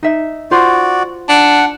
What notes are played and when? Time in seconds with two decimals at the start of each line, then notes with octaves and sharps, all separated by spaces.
0.03 D#4 E5
0.51 F4 F#4 C5 D5 C6
1.29 D4 F#5